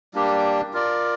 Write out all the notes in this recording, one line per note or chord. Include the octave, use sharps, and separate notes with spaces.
G3 A#3 D4 G4
F4 A#4 D5